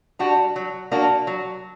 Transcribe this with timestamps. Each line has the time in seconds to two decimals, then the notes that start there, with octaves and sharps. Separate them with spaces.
0.19 G3 D4 F#4
0.56 F#3
0.92 A#3 D4 F#4
1.27 F#3